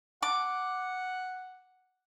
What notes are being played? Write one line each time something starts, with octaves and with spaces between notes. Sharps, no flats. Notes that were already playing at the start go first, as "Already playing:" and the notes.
F#5 D6